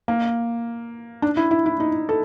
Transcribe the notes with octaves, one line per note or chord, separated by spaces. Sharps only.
A#3
D4
E4
E4
E4
D#4
A4